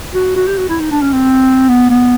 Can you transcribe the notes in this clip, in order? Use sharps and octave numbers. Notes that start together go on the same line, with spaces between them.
F#4
F#4
G4
F#4
E4
D#4
D4
C#4
C4
B3
B3